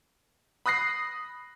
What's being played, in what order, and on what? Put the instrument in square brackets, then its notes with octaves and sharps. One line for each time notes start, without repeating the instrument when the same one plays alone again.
[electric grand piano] B5 D#6 F#6 A#6 C7